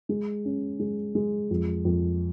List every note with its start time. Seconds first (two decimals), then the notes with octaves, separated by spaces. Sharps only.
0.09 G#3
0.45 C#4
0.79 G#3
1.15 G#3
1.50 F2
1.85 F2